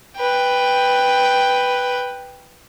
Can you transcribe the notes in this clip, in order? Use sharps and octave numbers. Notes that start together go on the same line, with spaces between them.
B4 G5